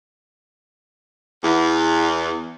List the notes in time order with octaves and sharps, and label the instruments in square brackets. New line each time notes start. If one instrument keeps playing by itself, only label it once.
[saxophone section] E2